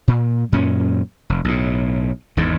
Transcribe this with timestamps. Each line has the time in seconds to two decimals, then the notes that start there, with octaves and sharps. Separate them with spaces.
0.08 A#2
0.52 F#2 A#2 C#4
1.30 F1
1.44 B1 A2
2.37 G#1 E2 G#2 D#3